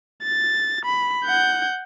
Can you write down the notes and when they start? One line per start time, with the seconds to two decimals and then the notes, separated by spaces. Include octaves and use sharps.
0.23 A6
0.85 B5
1.25 F#5 G6